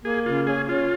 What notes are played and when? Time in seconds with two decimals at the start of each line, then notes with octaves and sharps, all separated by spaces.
0.05 A#3 G#4
0.26 C#3 F4
0.47 C#4 G#4
0.69 C#4 F4